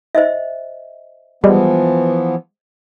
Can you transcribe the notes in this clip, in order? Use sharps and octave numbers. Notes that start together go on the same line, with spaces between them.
C5 D#5 E5
E3 F3 G3 G#3 B3